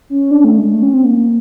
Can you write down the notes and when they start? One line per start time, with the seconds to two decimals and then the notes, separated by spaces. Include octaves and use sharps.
0.10 C#4
0.31 D4
0.44 A3
0.58 G#3
0.73 A3
0.83 C#4
0.94 C4
1.04 A#3